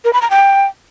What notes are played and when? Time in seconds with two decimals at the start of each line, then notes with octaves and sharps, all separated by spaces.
0.05 A#4
0.13 B5
0.22 A#5
0.30 G5